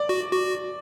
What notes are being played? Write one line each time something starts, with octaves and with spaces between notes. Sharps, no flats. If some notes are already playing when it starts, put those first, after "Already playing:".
Already playing: D5
F#4
F#4